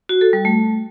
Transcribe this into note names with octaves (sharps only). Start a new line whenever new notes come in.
F#4
A4
G3
A3